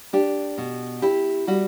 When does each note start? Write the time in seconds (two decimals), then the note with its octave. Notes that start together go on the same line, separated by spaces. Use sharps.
0.13 D4 G4
0.58 B2
1.02 E4 G4
1.47 G3 F#4